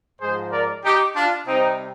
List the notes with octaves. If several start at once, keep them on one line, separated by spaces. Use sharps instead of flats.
G#2 F3 G#3 G#4 C5
A#4 D5
D#4 G4
D4 F4
C3 G3 C4 D#4